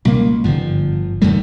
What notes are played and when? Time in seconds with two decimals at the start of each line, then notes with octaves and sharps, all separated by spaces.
0.05 C#2 B2 G3 A#3
0.44 G1 G#2 D3 F3
1.21 D#1 F#2 D#3 G3 A3